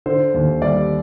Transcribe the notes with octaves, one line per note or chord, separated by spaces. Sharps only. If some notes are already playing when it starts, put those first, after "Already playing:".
D3 C5
D#2
G3 D5